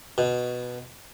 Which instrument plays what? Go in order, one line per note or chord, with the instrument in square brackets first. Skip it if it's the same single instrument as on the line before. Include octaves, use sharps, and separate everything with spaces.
[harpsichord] B2